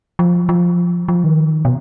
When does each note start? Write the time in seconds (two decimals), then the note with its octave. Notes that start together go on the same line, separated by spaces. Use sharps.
0.19 F3
0.49 F3
1.08 F3
1.24 D#3
1.65 B2